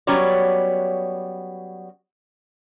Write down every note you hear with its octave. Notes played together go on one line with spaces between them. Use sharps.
F#3 G3 B3 C#4 C#5 D5